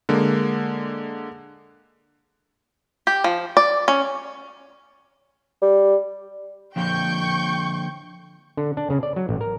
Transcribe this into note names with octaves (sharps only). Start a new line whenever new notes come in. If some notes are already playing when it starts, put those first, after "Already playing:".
D3 G#3 A#3
G4
F3
D5
C#4
G3
D3 F3 A#3 G5 C#6 G6
D3
D4
C#3
D5
F#3
A1
A#4